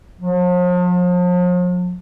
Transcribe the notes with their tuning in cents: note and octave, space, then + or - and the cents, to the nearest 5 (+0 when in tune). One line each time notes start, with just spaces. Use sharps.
F3 +40